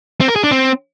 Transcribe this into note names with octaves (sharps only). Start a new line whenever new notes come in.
C4
A#4
G#4
D4
C4